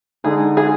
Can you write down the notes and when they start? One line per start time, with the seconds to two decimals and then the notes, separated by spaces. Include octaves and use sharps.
0.24 D3 G#3 D#4 G#4
0.57 G#4